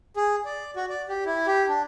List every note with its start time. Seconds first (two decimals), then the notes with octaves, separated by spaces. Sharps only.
0.16 G#4
0.45 D5
0.76 F#4
0.90 D5
1.09 G4
1.26 E4
1.47 G4
1.68 D4